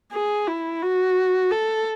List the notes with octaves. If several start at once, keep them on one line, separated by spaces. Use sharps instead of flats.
G#4
E4
F#4
A4